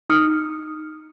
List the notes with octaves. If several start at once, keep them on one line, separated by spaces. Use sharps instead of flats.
D#4 D#6 F6 C#7